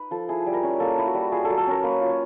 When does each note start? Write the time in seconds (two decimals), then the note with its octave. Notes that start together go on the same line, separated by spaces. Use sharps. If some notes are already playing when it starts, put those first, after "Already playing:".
Already playing: D#4 B4
0.11 F3 A4
0.29 E4 G#4
0.46 G3
0.54 A#4
0.63 C#4
0.80 A#3 A4
0.98 E4
1.06 F#4
1.14 G3
1.32 F4 G#4
1.45 A4
1.50 F#3
1.58 A4
1.67 C#4 A#4
1.83 A#3 B4
2.01 F4
2.10 C#5